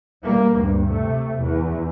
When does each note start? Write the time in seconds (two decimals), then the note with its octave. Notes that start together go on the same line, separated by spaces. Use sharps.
0.23 G3 A#3
0.55 D2 G2
0.88 C3 A3
1.40 E2